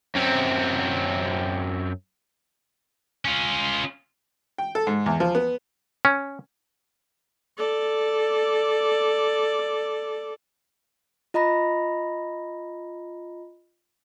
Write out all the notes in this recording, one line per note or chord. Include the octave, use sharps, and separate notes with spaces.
F#2 C4
C#4 F4
G5
A4
G#2
E2
F3
B3
C#4
A4 D5
F4 D#5 A#5 B5 A#6